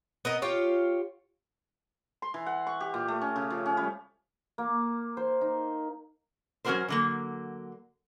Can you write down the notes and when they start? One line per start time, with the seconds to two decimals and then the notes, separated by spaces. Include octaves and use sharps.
0.25 B3 A#4 D#5
0.42 F4 G4 C#5
2.22 C6
2.34 E3
2.46 F#5
2.67 C#6
2.81 G4
2.94 A#2
3.08 A3
3.21 C#4
3.36 C#3
3.50 F3
3.66 C#4
3.77 G3
4.58 A#3
5.17 C5
5.41 D#4
6.65 F#3 C#4 D4 F#4 A#4 C5
6.88 D3 F#3 A#3